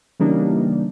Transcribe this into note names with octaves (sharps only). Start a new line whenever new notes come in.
C#3 E3 G3 A#3 D4 D#4